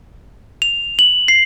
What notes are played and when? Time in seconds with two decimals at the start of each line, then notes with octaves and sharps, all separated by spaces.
0.62 F7
0.99 F#7
1.28 C7